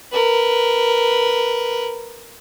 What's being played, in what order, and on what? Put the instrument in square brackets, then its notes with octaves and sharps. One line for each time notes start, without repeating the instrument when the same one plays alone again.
[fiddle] A#4 B4